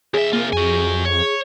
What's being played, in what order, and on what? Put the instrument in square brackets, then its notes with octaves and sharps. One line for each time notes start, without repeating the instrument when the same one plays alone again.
[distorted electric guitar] D#2 E5 [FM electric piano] G#4
[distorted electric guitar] C3 F4 [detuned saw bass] A#3
[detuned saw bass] F2 [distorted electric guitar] F#4 G#5
[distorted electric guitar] C#5